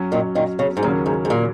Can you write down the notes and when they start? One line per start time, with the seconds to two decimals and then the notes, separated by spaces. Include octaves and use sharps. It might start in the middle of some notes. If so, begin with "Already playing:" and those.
Already playing: F#2 F#3 C#4
0.12 A#2 D#3
0.35 A#2 D#3
0.59 C#3
0.77 G#2
0.83 D#2 A#2 C#3 F#3 A#3 C#4
1.06 G#2
1.25 G#2
1.30 A#2